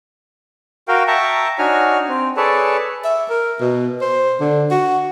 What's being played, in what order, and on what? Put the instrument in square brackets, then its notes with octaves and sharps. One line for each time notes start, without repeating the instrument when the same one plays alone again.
[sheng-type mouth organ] F#4 A#4 F5 G5
E5 G5 A5 A#5 C#6
D4 D#4 F#4 C#5 G#5 F6
C4
G#4 A4 B4 C#5 D5 A5
[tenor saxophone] E5
A#4
B2
C5
D3
F#4